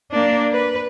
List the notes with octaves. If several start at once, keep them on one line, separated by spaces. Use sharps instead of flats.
A#3 D4
B4